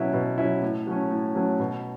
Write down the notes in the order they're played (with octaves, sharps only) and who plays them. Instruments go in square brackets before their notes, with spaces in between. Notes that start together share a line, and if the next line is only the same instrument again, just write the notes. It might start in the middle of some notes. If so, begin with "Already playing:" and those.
Already playing: [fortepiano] B2 F#3 C#4 E4
B2
F#3 C#4 E4
A2
F#3 A3 C#4
A2
F#3 A3 C#4
B2